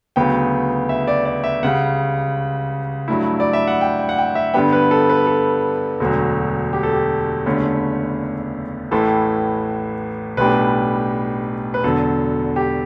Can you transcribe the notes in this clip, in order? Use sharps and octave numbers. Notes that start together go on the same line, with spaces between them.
D2 C#3 F#3 B3 G5
E5
D5
D5
E5
C#2 C#3 G3 F#5
G2 F#3 A3 E4
D5
E5
F#5
G5
G5
F#5
G5
E5
G2 D3 G3 B3 G5
B4
A4
B4
A4
E1 D2 D3 F#3
G4
A4
G4
F#1 E2 D3 A3 C#4
A1 A2 E3 A4
B1 A2 G3 D4 B4
B4
E1 E2 D3 F#3 A4
G4